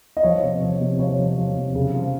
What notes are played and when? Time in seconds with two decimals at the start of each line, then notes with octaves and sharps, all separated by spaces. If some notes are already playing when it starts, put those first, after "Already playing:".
0.17 D#5
0.23 F3 C#5
0.43 C3
0.62 F3
0.81 C3
0.99 F3 C#5
1.19 F3
1.37 F3
1.56 C3
1.75 C#3
1.94 F3